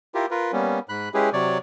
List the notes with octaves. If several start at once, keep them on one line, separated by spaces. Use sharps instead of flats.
E4 F4 G4 A#4
F4 A#4 B4
G3 A#3 B3 C#4
G#2 B5 F#6
G#3 C#4 E4 G4 G#4 B4
C3 F#3 C#5 D5